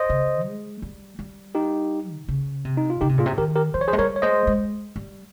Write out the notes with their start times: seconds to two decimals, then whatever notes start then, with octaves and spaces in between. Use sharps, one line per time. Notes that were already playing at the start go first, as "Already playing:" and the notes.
Already playing: C5 D#5
0.10 C#3
0.45 G#3
0.82 G3
1.19 G3
1.55 D#4 G4
2.16 C3
2.28 C#3
2.65 C3
2.77 D#4
2.90 F4
3.01 C#3 D#4 G4
3.09 C3
3.18 A#2 F4 G#4
3.26 C3
3.38 D#3 G4 A#4
3.56 G4 A#4
3.74 F3 C5
3.81 C#5
3.88 G#4 C5
3.93 G#3
3.98 G3 A#4 C#5
4.16 C#5
4.22 G#3 C5 D#5
4.47 G#3
4.96 G3